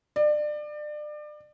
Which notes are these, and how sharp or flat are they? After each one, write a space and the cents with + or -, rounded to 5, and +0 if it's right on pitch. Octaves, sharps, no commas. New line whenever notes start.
D5 +30